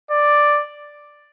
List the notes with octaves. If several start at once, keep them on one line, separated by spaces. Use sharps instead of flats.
D5